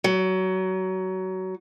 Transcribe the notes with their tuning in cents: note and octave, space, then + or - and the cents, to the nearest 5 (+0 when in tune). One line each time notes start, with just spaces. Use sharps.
F#3 +20